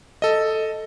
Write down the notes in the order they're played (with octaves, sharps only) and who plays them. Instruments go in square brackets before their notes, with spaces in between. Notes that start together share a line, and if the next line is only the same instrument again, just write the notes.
[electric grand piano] A4 D#5